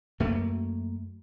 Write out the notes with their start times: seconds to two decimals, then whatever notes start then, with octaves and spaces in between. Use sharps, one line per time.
0.20 F#2 A3 A#3